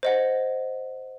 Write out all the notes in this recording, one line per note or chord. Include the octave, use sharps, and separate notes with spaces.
C5 D#5 F#5